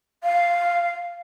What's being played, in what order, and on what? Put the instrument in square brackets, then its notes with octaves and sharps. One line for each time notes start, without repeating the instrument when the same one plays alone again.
[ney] F5